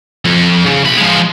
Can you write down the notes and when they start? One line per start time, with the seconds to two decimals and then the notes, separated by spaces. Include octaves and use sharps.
0.25 F2
0.66 C#3
0.84 B1 B5
0.97 F3 G#3